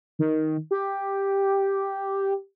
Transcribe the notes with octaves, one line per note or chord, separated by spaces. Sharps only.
D#3
G4